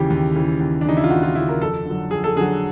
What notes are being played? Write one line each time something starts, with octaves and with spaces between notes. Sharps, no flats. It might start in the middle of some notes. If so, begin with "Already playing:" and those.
Already playing: D#2 C#3 E3 G4
D#2
C#3 E3
D#2
D4
C#3 E3 D#4
E4
F4
D#2 F#4
F4
C#3 E3 E4
A#4
F2 A4
D3 F#3
F2 G#4
A4
D3 F#3 G#4